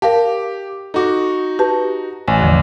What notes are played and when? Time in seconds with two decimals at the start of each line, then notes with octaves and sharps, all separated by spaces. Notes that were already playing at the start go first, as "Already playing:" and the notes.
0.02 G4 A#4 F5 A5
0.94 D#4 F#4 A4 D6
1.59 G4 B4 A5
2.28 A1 G#5
2.40 E2 D3 F3